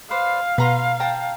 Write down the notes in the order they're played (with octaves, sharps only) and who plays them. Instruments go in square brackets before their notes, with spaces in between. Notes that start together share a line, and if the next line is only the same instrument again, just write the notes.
[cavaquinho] B4 C5 D5 [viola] F5
[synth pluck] B2 [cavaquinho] B4 A#5 C6
[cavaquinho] G5 A5 A#5